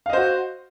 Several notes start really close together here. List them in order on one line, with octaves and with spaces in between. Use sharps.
F5 D#5 C5 F#4